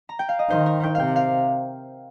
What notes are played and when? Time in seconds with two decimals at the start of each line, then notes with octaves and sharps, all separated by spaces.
0.09 A#5
0.19 G5
0.29 F5
0.39 D#5
0.50 D#3 C5
0.66 A#4
0.83 G5
0.95 C3 F5 G5
1.16 F5